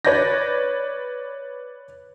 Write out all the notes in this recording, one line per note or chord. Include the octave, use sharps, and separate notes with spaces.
B4 C#5 D5 G6 A#6